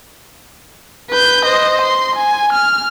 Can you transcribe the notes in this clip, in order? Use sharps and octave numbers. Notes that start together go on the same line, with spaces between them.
B4 G6
C5 D#5
C6
G#5
F6